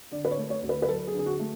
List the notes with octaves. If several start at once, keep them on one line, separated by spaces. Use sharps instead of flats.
D3 D5
B4
C#5
A3
C#5
D2
B4
B4
F#3 A4
G#4
D3
G#4
F#4
A3